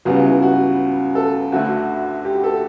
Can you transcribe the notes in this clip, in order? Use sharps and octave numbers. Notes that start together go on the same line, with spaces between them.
C#2 C#3 G3 B3 F#4
E4
F#4
A4
D2 D3 A3 F#4
G4
A4